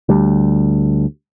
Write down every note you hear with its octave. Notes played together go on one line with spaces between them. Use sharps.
D2 G3